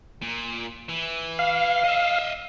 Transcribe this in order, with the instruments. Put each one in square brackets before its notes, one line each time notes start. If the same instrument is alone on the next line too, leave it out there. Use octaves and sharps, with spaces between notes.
[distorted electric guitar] A#2
E3
[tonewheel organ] F5
[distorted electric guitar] D#5 E5